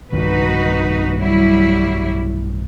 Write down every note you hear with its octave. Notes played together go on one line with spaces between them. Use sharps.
B1 G2 D#3 D#4 F#4 B4
F#3 G3 E4